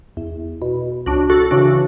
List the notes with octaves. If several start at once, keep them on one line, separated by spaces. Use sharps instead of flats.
E2
B2
C#2 D4 F#4
F#4 A4
C#3 E3 D4 F#4